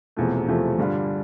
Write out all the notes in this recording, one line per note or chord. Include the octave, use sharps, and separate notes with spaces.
E1 E2 C3 F3 A3
E1 E2 C3 F3 A3
G2 D3 G3 D4 F4